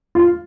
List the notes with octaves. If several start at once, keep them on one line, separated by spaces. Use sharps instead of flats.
F4